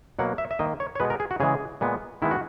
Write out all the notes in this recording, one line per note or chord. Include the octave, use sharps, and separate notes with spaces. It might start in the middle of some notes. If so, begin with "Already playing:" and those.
B2 F#3 A#3 F#5
E5
E5
D#3 A#3 D#5
C#5
C#5
B2 G#3 B3 B4
A#4
G#4
F#4
C#3 E3 G#3 G#4
A#2 G#3 B3
D#3 G#3 B3 E4
F#4